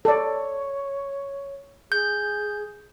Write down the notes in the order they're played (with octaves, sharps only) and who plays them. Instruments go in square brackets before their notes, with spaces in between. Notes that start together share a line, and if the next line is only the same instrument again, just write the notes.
[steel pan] A4 D5 [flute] C#5
[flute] G#4 [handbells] G6